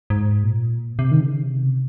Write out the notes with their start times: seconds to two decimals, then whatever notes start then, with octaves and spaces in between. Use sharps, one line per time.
0.10 G#2
0.43 A#2
0.99 C3
1.11 D#3
1.21 C#3
1.43 C3